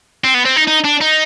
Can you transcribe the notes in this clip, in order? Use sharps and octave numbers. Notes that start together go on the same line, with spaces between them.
C4
B3
C4
D#4
D#4
D4
D#4